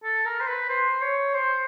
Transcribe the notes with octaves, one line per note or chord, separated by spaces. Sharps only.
A4
A#4
C5
B4
C5
C#5
C5